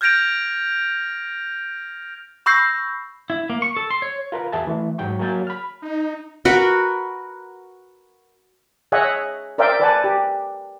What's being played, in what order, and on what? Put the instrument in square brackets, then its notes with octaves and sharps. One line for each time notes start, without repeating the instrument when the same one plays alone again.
[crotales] F6 G6 G#6 A#6 D7 F7
[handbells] B5 C#6 E6 G6 A#6 C7
[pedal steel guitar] E4
A#3
C#6
A4
C6
C#5
[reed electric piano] F4 A#4 B4 F5
E2 F#4 G#4 E5 G#5 A5
E3 A3
G#2 F#3 G5 C#6
F#3 A#3 F5 G#5 G6 A6
B5 F6
[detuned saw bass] D#4
[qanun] F#4 A#4 B4 F#5
[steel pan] G#4 C#5 D#5 E5 F#5 G#5
A#4 C5 D5 E5 F5 G5
A4 B4 D5 F#5 G#5 A5
G4